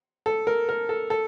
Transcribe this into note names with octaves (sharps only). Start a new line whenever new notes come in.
A4
A#4
A#4
A4
A4